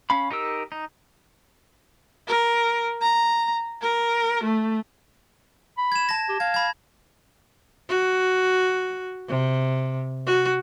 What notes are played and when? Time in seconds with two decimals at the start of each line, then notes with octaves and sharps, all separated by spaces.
0.10 C#4 F5 B5
0.31 D#4 G4 A#4 E6
0.72 D#4
2.28 A#4
3.02 A#5
3.82 A#4
4.44 A3
5.78 B5
5.92 G#6 E7
6.09 A5 A#6
6.29 G4
6.40 F5 G#6
6.54 B5 G#6
7.89 F#4
9.28 C3
10.26 F#4